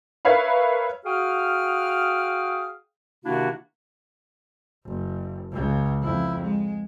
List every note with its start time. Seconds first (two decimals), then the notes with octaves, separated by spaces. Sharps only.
0.25 A#4 B4 C#5 E5 F5 B5
1.05 F#4 G#4 F5 G5 D#6 F6
3.25 C3 D#3 A#3 D4 E4 F#4
4.86 F#1
5.52 C#2 C#3
6.02 F2 E4
6.42 G#3